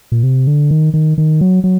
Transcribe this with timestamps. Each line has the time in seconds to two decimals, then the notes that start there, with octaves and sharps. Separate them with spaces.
0.12 A#2
0.23 C3
0.47 D3
0.71 D#3
0.94 D#3
1.18 D#3
1.41 F#3
1.64 F#3